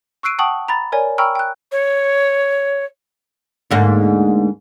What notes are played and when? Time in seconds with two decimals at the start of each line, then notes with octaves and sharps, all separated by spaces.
0.23 C#6 E6 F#6 C7 D7 D#7
0.39 F#5 G5 A5 C#6 D#6 F#7
0.68 A#5 B5 A6
0.92 A#4 C#5 D5 G#5
1.18 G5 A#5 B5 C#6 E6 F6
1.35 G5 F#6
1.72 C#5
3.71 D2 G#2 A#3